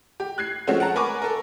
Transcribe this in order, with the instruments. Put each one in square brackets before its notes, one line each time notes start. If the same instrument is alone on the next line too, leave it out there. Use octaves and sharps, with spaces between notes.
[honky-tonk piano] G4
F#6 G#6 C7
F3 G#3 A3 C4 C#4 F#4
F#5 A5 A#5
A#4 B4 G#5 C#6 D6
A4 A#4